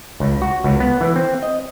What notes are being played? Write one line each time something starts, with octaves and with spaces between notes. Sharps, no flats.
C#2
F#4
C#2
B3
E3
C4
D#5